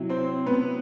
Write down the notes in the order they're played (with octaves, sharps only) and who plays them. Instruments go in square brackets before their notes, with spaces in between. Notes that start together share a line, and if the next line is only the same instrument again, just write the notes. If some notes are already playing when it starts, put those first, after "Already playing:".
Already playing: [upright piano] C3 F#3 E4
C4 C5
B3 B4